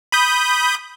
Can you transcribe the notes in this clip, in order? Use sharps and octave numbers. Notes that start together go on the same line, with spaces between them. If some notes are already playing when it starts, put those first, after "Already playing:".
B5 D#6 G6